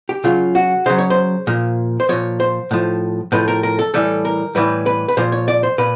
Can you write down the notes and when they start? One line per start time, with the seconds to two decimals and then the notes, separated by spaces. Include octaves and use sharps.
0.09 G4
0.24 C#3 F#3 F4
0.55 F#4
0.86 C#3 F#3 C5
0.98 C#5
1.10 C5
1.47 A#2 F3
2.00 C5
2.09 A#2 F3 C#5
2.40 C5
2.71 A2 F3
3.32 A2 F3 B4
3.48 A#4
3.63 A#4
3.79 A4
3.94 A2 E3 G3 A4
4.25 A#4
4.55 A2 E3 G3 B4
4.86 B4
5.08 B4
5.17 A#2 F3 C5
5.32 C#5
5.48 D5
5.63 C5
5.78 A#2 B4